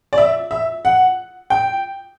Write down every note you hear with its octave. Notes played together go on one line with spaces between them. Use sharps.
D5
E5
E5
F#5
G5